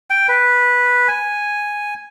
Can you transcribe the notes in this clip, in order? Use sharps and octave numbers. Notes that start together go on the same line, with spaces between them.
G5
B4
G#5